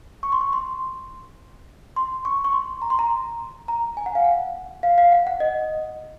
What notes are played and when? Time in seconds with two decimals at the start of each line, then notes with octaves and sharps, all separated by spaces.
0.23 C#6
0.32 C6
0.41 C#6
0.53 C6
1.96 C6
2.25 C#6
2.44 C#6
2.53 C6
2.82 A#5
2.90 C6
2.99 A#5
3.68 A#5
3.97 G#5
4.06 F#5
4.15 F5
4.25 F#5
4.83 F5
4.98 F5
5.12 F#5
5.27 F#5
5.40 D#5